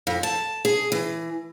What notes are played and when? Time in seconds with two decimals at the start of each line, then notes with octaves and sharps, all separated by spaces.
0.07 F2
0.23 A5
0.65 G#4
0.92 E3